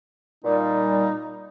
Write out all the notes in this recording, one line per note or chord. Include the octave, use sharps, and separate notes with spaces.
A#2 G3 D#4